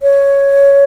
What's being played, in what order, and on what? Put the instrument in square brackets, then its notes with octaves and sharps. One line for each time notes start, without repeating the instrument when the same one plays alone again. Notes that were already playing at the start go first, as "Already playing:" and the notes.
[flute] C#5